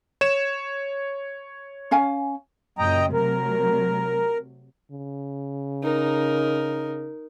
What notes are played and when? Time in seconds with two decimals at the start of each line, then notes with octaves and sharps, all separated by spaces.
0.21 C#5 E7
1.91 C#4 F5 G#5
2.79 F#2 A#2 C#3 D#5 G5 A#5
3.13 C3 F#3 A3 A#4
4.92 C#3
5.84 D#4 A#4